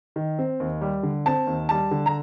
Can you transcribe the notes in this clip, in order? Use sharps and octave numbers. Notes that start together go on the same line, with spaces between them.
D#3
C4
D#2
G3
D3
C4 A5
D#2
G3 A5
D3
A#5